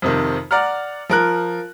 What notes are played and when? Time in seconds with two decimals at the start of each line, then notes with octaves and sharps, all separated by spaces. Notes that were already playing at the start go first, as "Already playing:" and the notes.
0.02 F2 C3 D#3
0.51 D5 F#5 A#5 F6
1.09 F3 A#4 F#6